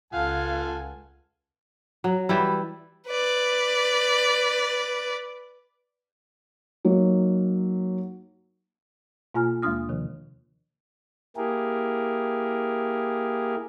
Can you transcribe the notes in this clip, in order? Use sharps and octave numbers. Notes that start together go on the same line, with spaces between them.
C#2 F4 A4 F5 F#5 G#5
F#3
E3 G3 E4
B4 D5
F#3 A#3 D#4
B2 A#3 F4 G#5 A#5 F6
D#2 G#3 A#3 D4 D#6 F6
C3 D#3 F3
A#3 E4 G4 G#4 A#4